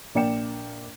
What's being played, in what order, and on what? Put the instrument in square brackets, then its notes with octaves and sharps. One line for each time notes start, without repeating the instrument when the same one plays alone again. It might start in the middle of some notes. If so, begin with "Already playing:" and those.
[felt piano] A#1 A#3 D5 G5 C#7 E7